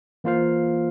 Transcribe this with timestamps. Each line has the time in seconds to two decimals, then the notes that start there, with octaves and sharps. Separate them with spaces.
0.24 E3 A#3 F4 C5 F5